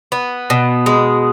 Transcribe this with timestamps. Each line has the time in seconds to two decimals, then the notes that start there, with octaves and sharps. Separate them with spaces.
0.12 B3
0.50 B2
0.86 G#3